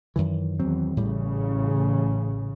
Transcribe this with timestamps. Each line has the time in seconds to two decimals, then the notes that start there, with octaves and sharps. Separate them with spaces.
0.16 F#2 D#3 E3
0.60 E2 D#3 F#3 C4
0.97 A1 A2 C#3 G3